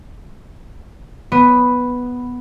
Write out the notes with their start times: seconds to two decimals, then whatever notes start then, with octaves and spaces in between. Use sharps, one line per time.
1.32 B3